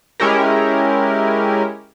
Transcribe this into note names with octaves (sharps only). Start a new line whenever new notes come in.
G#3 C#4 E4 G4 A#4